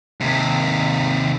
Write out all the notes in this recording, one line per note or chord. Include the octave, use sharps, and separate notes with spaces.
D#2 C3